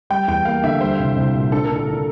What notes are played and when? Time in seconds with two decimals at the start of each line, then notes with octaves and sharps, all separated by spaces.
0.10 G3 G5
0.28 E2 G5
0.45 A#3 F5
0.64 D3 E5
0.81 G3 C5
0.99 C2
1.16 C2
1.35 A#2
1.52 D4 A4
1.64 A#4
1.70 D3
1.76 A4
1.88 D3